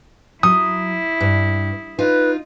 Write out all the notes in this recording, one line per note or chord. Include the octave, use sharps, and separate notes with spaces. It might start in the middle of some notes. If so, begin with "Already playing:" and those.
F#3 E4 D#6
G2
D#4 F4 B4